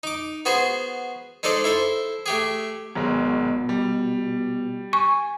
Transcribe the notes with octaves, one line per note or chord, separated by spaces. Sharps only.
D#4 D6
B3 F#4 G#4 C5
G#3 D#4 A4 C5 D5 D#5
E4 A4 C5
A3 G4 G#4
G#1 B2 F#3 G#3
G3
G#5 C#6